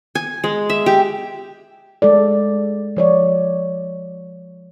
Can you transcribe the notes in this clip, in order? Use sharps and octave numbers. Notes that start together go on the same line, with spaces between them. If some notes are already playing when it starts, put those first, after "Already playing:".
G#5
G#3
E5
G4
G#3 A4 D5
F3 C#5 D5